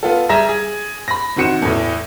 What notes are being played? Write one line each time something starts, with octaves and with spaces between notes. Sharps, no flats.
B3 F4 A4
G3 G#4 E5 A#5 A#6 E7
G#4
B5 A#6
C3 D#3 F#4 C#7 E7
E2 A2